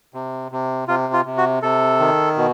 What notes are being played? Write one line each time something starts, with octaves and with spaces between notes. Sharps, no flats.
C3
C3
C3 F4
F4
C3
F#4
C3 A4
D#3
B2